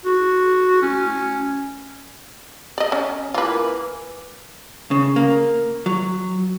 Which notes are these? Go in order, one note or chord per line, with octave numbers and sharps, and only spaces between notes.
F#4
C#4
D5 D#5
C#4
E3 A#3 F4 B4
C#3
A#3
F#3